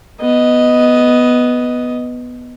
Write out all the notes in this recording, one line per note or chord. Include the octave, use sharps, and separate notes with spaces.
B3 D#5